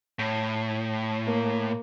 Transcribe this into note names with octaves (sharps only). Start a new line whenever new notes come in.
A2
A#3